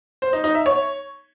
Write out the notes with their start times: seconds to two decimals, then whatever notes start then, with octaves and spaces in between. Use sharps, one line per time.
0.22 C5
0.33 D#4
0.44 D#4
0.55 E5
0.66 C#5